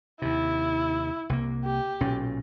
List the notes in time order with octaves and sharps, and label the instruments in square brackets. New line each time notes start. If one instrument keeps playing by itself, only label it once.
[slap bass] D#2 C3 [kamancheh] E4
[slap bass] C2 C3 A#3
[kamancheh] G4
[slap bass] B1 A#2 C#4